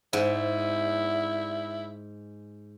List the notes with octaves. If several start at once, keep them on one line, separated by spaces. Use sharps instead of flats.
G#2 E4